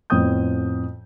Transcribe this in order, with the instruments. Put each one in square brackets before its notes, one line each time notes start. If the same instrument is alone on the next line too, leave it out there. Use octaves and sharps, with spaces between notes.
[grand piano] F2 A2 B3 G5 D#6 G6